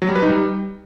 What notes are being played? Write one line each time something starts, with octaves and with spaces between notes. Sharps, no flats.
F#3
G3
B4
D#4
G3